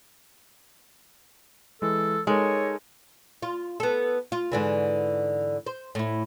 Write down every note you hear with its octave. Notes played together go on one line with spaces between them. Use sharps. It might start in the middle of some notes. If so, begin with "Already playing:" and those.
E3 G#3 A4
G#3 D#4 A4 A#4 C#5
F4
B3 A4
F4
G#2 D3 E3
C5
A2 E4